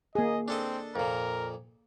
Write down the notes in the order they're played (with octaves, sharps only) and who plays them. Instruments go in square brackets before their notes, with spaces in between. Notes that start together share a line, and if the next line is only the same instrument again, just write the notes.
[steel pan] A#3 G#4 [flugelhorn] D#5
[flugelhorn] C4 [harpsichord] D4 A4 D#5
[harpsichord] F2 A#2 [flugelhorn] A#4